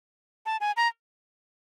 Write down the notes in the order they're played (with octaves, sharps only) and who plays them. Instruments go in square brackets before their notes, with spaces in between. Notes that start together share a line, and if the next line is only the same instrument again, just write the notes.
[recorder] A5
G#5
A#5